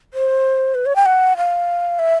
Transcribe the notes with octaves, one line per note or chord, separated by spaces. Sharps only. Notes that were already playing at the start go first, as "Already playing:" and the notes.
C5
B4
C#5
G5
F#5
F5
E5